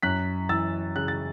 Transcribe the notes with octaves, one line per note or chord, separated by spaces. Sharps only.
F#2 F#6 B6
E3 E6 A6
C#3 F#6
A6